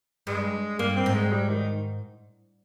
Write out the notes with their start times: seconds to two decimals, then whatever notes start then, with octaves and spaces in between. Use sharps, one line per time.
0.27 G2 G#3
0.79 G2 A#3
0.96 C4
1.06 G#2
1.14 G#3
1.32 G3
1.49 D#3